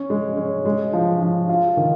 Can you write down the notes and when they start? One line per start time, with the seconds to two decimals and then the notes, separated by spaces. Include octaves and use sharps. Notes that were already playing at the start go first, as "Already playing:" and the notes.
Already playing: C#4
0.10 G#3
0.37 C#4
0.65 G#3
0.93 F3
1.22 F3
1.49 F4
1.77 D#3